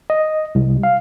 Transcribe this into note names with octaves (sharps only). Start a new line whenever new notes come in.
D#5
C2
F5